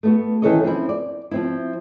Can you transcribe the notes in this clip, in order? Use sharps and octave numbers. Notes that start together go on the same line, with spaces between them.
A3 B3 F#4
D#3 E3 C#4 A4 C#5 D#5
F3 C4 C#4 E4
D5
F3 C4 E4